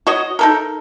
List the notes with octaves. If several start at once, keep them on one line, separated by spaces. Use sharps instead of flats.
F#4 C#5 D#5
D#4 A4 A#4